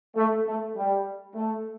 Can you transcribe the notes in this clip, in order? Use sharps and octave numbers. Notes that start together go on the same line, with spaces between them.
A3
A3
G3
A3